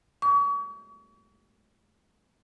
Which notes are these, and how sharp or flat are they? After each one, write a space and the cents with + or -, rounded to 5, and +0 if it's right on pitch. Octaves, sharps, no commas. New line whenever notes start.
C#6 +40